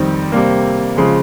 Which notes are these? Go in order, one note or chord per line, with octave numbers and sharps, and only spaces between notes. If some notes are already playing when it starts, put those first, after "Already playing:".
Already playing: F2 D#3 G3 C4
C3 G3 A#3
C#3 F3 G#3